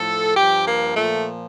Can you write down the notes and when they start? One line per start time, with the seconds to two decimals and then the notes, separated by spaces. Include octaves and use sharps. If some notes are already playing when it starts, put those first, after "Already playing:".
Already playing: A2 F3 A4
0.37 G2 F3 G4
0.67 A#3
0.96 A#2 F3 A3